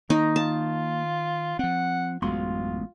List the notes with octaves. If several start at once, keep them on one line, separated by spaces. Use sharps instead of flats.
D#3 A#3 D#4
F4 A5
F3 C4 F#5
A1 F#2 G#3 B3 F4 C6